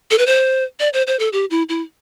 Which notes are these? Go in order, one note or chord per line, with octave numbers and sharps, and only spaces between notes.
A4
B4
C5
D5
C5
C5
A4
G4
E4
E4